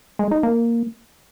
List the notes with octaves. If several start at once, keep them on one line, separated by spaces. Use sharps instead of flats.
G#3
D#4
A#3